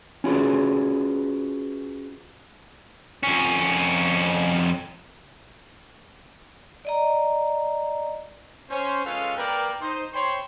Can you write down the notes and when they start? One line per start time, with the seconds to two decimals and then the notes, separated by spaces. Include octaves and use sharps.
0.24 C#4 F4 F#4 G#4 B4
3.23 F2 C#4
6.85 D5 D#5 A#5
8.69 C#4 C5
9.04 G#3 C#4 F4 A4 B4 F5
9.36 A#3 A#4 B4 D5 G5
9.80 D#4 C5
10.13 C5 C#5 G5 B5 C6